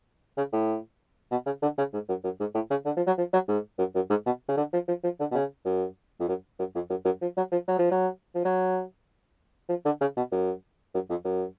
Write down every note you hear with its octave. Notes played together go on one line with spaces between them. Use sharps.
C#3
A2
B2
C#3
D3
C#3
G#2
F#2
F#2
G#2
A2
C#3
D3
F3
F#3
F3
F#3
G#2
F#2
F#2
G#2
B2
C#3
D3
F3
F3
F3
D3
B2
C#3
F#2
F2
F#2
F#2
F2
F#2
F#2
F3
F#3
F3
F#3
F3
F#3
F3
F#3
F3
D3
C#3
B2
F#2
F#2
F2
F#2